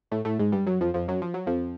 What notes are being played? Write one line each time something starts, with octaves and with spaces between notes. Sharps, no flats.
A2 A3
A2 A3
G#2 G#3
G2 G3
F#2 F#3
F2 F3
F2 F3
F#2 F#3
F3
F#3
F2 F3